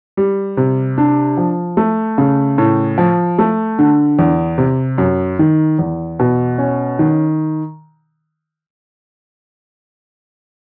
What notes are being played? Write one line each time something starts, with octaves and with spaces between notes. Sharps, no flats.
G3
C3
D4
F3
A3
C#3
A2
F3
A3
D3
E2
C3
F#2
D#3
E2
B2
C#4
D#3